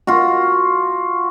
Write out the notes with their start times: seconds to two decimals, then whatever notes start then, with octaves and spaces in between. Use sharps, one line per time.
0.07 F4 F#4